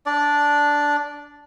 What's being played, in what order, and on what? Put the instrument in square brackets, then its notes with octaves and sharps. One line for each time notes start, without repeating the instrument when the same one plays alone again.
[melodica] D4 D5